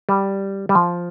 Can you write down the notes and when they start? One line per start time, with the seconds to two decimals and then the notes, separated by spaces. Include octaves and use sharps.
0.09 G3
0.69 G3
0.75 F3